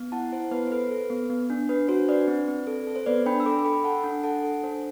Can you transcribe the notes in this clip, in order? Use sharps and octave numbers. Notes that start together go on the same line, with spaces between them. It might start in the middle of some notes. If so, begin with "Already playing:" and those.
Already playing: B3
E4 F#5 A5
E4 C5
B3 B4
C5
A4 B4
A4
B3
B3
D4
D4 B4
F#4 C5
D4 B4 D5
C4
C4
A4
A4
C5
B3 B4 D5
D4 G5 B5
E6
A4 B5 D6
A4 G5 B5
A4 F#5 A5
D4
A4 F#5 A5
A4
D4 C5